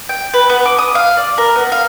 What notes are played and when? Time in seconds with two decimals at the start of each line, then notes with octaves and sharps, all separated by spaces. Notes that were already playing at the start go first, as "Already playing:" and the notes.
0.09 G5
0.34 B4
0.50 B3
0.66 D6
0.79 D#6
0.95 F5
1.17 D5
1.38 A#4
1.56 B3
1.72 F5